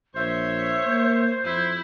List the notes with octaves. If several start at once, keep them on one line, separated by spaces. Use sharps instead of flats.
A#1 C5 C#5 E5
A#3
F2 E4 G6